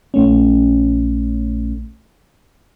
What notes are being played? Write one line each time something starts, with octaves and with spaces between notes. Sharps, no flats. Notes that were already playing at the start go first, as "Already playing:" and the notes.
A#1 A3 C#4